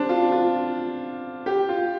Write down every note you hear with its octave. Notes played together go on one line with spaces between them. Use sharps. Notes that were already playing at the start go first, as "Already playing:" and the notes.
Already playing: C4 D4
F4
F4
G4
F4